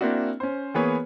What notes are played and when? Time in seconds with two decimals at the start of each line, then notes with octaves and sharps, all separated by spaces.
0.01 A#3 C4 D4 E4 F#4
0.40 C#4 C5
0.74 E3 A#3 B3 G#4 B4 C#5